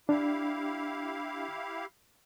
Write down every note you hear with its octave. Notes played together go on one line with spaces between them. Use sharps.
D4 E4 G4 F5